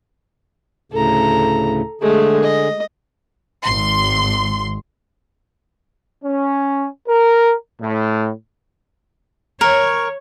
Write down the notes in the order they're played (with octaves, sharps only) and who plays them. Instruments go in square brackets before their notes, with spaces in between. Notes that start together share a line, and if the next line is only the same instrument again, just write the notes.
[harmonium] D2 A2 C#3 [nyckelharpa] A4 A#5
[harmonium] D3 G#4 [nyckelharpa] G#3 A3
[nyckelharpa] D#5
[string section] G#1 C6
[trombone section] C#4
A#4
A2
[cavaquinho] A#4 [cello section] C#5